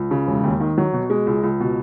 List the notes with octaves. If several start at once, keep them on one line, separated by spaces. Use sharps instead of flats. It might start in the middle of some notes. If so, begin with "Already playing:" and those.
Already playing: C#2
C#3
E1
D#2
D#3
F#3
B2
G#3
C#2
C#2
B2